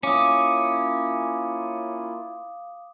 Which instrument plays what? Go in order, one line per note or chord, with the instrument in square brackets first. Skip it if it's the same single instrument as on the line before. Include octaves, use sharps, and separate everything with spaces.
[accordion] A#3 E4 F4 [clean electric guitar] C#4 [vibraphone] F5 [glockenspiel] D6 D#6